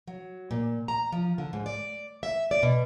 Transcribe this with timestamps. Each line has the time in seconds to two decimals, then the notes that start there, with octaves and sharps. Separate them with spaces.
0.08 F#3
0.51 A#2
0.88 A#5
1.12 F3
1.38 D3
1.53 G#2
1.66 D5
2.23 E5
2.51 D5
2.63 B2